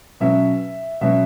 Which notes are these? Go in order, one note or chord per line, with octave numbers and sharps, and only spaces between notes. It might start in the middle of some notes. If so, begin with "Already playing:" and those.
B2 F#3 C#4 E5
B2 F#3 C#4 E5